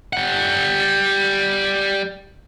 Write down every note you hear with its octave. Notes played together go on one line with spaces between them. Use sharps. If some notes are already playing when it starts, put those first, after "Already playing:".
G3 F#5